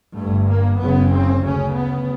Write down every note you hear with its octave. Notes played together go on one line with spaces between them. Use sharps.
G1 G2 A3
A#3
F#1 F#2 C#3 B3
C4
D2 C#3 C#4
B3